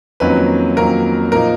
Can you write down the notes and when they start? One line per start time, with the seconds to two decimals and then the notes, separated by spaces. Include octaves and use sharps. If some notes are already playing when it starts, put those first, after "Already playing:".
0.20 F2 D#3 F#3 A#3 C#4 B4
0.76 F2 D#3 F#3 A#3 C#4 A#4
1.32 A#2 F3 A#3 D#4 A#4